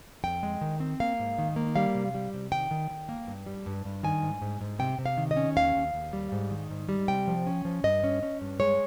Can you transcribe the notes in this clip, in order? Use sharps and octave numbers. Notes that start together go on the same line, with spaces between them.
F2 G5
G#3
D#3
C4
A#3 F5
G#2
D#3
A#3
G3 F5
C3
G3
C3
D#3 G5
D#3
D#3
A#3
G2
G3
G2
G2
D#3 G#5
G#2
G#2
G#2
C3 G5
C3
F5
D#3
D#5
C#4
D#2 F5
D#2
D#2
G3
G#2
D#3
G#2
G3
C3 G5
F3
C#4
F3
G2 D#5
C#4
C#4
G2
G#3 C#5